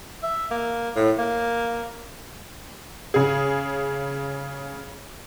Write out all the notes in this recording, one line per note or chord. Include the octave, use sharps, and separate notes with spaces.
E5
A#3
A2
A#3
C#3 G#4